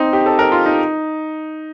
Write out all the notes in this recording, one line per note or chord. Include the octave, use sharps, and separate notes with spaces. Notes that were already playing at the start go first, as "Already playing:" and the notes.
Already playing: C4 D#4
G4
A4
A#4
F4
D#4